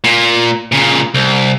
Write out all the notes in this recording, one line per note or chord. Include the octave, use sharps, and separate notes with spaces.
A#2
A#2 C#3
C2